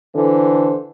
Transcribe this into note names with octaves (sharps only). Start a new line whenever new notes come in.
D3 E3 A4 C5